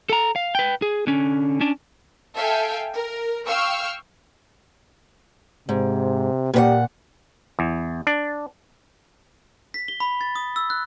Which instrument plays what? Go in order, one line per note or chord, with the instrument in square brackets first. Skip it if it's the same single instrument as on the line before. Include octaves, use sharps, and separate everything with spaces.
[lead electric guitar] A4 A#5
F5
B4 G5
G#4
D3 C#4
C#4 D4
[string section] A4 E5 F5 G5 G#5
A#4
F5 G5 C#6 E6 F6
[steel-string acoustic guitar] G#2 [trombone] C3
[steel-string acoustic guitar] A#2 B4 F#5 [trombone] G4
[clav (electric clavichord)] E2
D4
[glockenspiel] B6
G7
B5
A6
D#6
E6
F#6